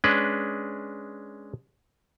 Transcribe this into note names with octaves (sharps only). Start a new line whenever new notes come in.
G#3 C#4 D4 B4